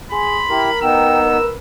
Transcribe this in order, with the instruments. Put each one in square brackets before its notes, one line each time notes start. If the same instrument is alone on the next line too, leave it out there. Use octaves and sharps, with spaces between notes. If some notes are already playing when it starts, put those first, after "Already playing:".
[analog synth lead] G#4 [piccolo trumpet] B5 [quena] C6
[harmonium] E4 G4 [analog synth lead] A#4
[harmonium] B3 D#4 [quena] G5 [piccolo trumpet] E6
[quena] B4